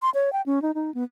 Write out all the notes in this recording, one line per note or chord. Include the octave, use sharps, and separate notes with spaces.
C6
C#5
G5
C#4
D#4
D#4
B3